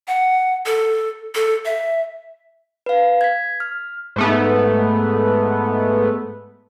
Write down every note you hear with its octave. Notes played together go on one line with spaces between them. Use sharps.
F#5
A4
A4
E5
B4 F5
G#6 B6
F6
G#2 A3 B3